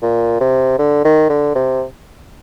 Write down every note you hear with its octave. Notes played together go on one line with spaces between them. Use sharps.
A#2
C3
D3
D#3
D3
C3